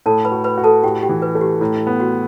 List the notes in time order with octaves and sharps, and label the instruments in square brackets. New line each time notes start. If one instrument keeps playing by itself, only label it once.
[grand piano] A2 [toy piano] A4 A5
[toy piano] B4 B5
[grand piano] F#4
[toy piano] B4 B5
[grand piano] F#4
[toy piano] A4 A5
[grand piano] A2 [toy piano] G4 G5
[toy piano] G4 G5
[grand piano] E3
[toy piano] B4
[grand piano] A3
[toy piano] G4
[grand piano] A2 [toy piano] E4
[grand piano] B3
[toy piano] F#4